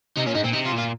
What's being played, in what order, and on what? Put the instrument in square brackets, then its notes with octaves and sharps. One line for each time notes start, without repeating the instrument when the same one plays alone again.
[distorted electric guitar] C3 [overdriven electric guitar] D#4
[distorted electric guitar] A#2 [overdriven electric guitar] C#4
[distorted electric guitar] G#2 [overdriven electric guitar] D#4
[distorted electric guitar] A#2 [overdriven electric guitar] C4
[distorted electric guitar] C3 [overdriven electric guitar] D#4
[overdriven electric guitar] F4
[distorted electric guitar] A#2
[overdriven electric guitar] F4